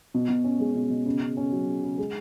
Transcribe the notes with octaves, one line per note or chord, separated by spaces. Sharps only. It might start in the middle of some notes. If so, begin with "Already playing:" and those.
B2
B2
C#4
G#3
B2
B2
C#3
C#3
C#4
F#3
C#3
C#3
G#3